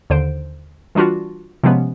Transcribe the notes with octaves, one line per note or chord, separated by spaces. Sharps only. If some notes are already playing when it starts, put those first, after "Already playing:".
D#2 D3 C5 D7
E3 G3 D4 F4 F#4
C3 F3 G#3 B3 C#4